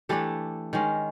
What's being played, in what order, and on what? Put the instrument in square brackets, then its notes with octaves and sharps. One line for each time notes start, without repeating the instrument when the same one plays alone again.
[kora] E3 A3 D4 G4 A4
D#3 G#3 C#4